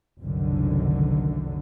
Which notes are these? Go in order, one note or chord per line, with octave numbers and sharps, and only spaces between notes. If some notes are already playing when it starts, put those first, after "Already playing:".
F#1 C2 F#2 D3 D#3